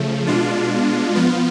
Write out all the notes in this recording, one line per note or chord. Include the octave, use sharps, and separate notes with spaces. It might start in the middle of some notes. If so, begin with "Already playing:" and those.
Already playing: C#3 F3 A3
B2 G#3 D4 F4
F3 B3 F4